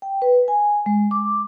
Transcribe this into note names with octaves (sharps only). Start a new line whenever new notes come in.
G5
B4
G#5
G#3
D6